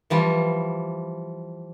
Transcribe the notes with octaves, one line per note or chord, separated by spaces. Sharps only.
E3 F3 G3